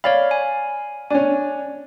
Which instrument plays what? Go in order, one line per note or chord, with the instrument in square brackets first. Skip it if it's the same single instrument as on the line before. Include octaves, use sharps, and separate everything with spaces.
[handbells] C#5 D5 B5 [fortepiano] F5
[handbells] G#5
[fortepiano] C#4 D4 [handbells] G#5